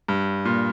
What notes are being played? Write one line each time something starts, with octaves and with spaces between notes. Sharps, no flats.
G2
A#2